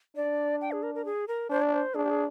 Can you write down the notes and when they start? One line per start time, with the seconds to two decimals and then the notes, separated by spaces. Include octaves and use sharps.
0.16 D4 D5
0.61 G5
0.72 G#4
0.83 A#4
0.95 A#4
1.05 G#4
1.28 A#4
1.50 D4 C5
1.62 D5
1.73 C5
1.95 D4 G#4
2.05 G4
2.10 G#4